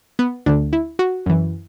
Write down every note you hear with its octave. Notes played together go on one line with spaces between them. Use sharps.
B3
D2 D3 D4
E4
F#4
F#2 E3